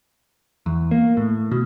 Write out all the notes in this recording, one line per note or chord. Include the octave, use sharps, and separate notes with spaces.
E2
A#3
A2
B2